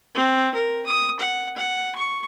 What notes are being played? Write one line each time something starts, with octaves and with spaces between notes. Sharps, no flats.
C4
A#4
D#6
F#5
F#5
C#6